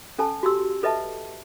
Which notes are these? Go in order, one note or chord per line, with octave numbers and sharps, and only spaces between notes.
C#4 A4 G#5 A5
F#4 G4 C6 E6
A4 B4 D#5 E5 A5